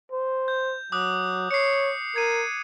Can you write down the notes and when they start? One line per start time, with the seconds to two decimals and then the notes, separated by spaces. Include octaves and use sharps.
0.12 C5
0.48 G6
0.92 F#3 D6 D#6 F#6
1.51 C#5 C7 C#7
2.16 A#4 G#6 D#7